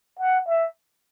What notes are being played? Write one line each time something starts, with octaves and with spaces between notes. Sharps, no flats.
F#5
E5